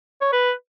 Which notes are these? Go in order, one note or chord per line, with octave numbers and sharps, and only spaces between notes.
C#5
B4